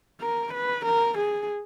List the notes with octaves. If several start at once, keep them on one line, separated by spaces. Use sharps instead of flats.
A#4
B4
A#4
G#4